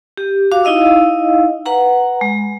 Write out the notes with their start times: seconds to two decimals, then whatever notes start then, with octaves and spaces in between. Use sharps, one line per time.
0.18 G4
0.52 F#4 F5 D6
0.64 D#4 E4 D#5 F5 E6
1.66 B4 F#5 A#5
2.21 G#3